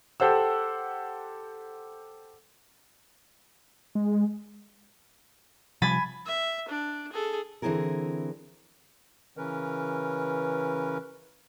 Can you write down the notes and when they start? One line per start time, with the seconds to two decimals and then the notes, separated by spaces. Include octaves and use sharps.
0.20 G4 A4 C5 F#5 E6
3.95 G#3
5.82 C3 F3 G3 G#5 B5 A6
6.25 E5
6.68 D4
7.12 G#4 A4
7.62 D3 E3 C4 E4 G#4 A#4
9.37 C#3 E3 C#4 A#4 B4